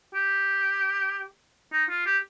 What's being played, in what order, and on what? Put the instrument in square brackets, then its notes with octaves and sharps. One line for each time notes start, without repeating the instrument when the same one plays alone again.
[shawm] G4
D#4
F4
G4